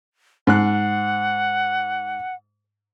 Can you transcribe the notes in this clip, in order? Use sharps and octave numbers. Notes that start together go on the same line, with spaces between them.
G#2 F#5 F#6